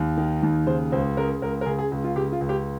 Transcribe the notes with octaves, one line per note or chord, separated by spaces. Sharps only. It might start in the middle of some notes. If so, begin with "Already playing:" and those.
Already playing: D#2
D#3
D#2
C#3 C5
C#2 C5
C#3 A#4
C#2 A#4
A#4
C#3 G#4
G#4
C#2
F4
C#3 G4
F4
C#2
G4